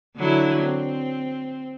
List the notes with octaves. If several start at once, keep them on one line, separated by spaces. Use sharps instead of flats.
D3 F#3 E4
C4